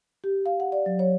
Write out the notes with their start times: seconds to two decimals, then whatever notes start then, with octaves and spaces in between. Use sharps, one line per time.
0.24 G4
0.46 F5
0.60 F#5
0.72 D5
0.86 F#3
0.99 C#5